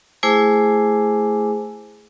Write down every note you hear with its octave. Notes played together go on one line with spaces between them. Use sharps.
A3 E4 G#4 C5 G#5 D6